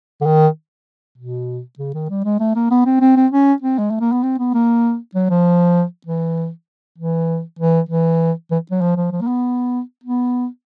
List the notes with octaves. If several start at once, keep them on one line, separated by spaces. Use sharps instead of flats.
D3
D#3
B2
C#3
D#3
G3
G#3
A3
A#3
B3
C4
C4
C4
C#4
C4
G#3
A3
A#3
B3
C4
B3
A#3
F#3
F3
E3
E3
E3
E3
E3
F#3
F3
F3
F3
A#3
B3
B3